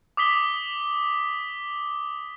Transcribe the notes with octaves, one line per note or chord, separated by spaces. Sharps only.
D6 D#6 B6 G7